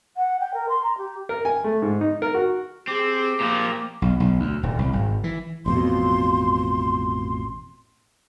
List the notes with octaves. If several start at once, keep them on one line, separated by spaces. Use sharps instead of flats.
F#5
G5
A#4
C6
A#5
G4
A#4
G#5
A3
G#2
D#4
A#4
F#4
C4 G4 G#4
A#2 F3 A#3
B1
B1
D2
D#1
C2
G#1
E3
A1 F2 B2 C6